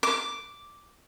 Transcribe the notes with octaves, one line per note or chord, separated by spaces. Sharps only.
D6